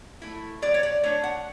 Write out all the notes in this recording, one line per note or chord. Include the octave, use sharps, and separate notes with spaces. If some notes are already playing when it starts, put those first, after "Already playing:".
A3 E4
F#3 D5
C#5
D5
A3 D4 C#5
F#5